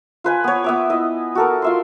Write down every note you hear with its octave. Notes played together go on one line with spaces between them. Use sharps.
F4 B4 G#5
B3 C#5
B3 E5 D6
E4 D#5
F#4 A4 A#4
F4 E5 C6